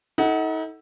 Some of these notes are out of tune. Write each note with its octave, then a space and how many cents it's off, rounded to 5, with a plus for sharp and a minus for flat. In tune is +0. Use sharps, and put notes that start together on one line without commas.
D#4 +40 A4 +0 F#5 +10